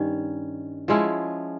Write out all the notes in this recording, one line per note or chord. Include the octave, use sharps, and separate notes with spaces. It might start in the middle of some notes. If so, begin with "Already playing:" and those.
Already playing: G2 D#3 C#4
F3 G#3 C#4 E4